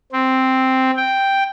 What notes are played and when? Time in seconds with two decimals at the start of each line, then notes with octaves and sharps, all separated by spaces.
0.12 C4
0.97 G5